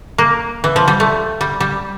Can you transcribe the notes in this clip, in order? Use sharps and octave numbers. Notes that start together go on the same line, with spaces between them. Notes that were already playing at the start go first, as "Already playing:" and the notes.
A#3
E3
F3
G3
A3
G3
G3